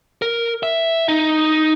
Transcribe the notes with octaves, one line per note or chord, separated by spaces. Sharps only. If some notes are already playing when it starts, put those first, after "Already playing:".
A#4
E5
D#4